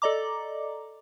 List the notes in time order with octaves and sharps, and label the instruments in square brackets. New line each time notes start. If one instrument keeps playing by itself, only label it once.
[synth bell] A4 D5 D#5 A#5 D6